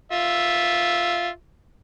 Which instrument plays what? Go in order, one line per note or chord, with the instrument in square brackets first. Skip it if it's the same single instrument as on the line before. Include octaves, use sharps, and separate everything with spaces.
[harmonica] F4 E5